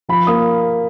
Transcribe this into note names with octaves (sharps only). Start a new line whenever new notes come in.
F3 B5
A#3 D#6